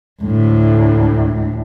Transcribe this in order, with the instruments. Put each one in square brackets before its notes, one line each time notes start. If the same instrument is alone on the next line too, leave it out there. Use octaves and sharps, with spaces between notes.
[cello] D2 A2